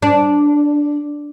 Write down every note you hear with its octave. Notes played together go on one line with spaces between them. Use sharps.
D4